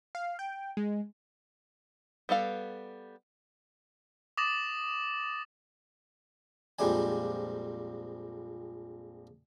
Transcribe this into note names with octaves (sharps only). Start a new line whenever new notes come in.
F5
G5
G#3
G3 B3 A4 F5
D6 D#6 A6 A#6 E7 F#7
A#1 F2 G3 G#3 D4 G#5